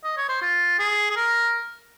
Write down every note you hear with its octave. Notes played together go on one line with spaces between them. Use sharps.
D#5
C#5
C5
F4
G#4
G#4
A#4